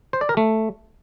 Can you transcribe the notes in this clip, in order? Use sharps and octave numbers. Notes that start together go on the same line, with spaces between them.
C5
D5
A#4
A3